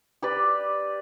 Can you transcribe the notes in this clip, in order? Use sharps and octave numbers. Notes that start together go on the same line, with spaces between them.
G4 B4 D5